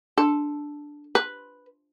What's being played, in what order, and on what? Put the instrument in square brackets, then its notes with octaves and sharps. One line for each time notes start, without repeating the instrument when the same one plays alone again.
[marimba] D4 [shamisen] A4
[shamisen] B4